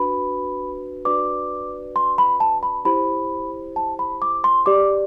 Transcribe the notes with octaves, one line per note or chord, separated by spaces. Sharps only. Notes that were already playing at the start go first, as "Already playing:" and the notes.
Already playing: D4 F#4 B4 B5
D4 F#4 B4 D5 D6
C6
B5
A5
B5
E4 G4 C5 B5
A5
B5
D6
C6
G4 D5 D6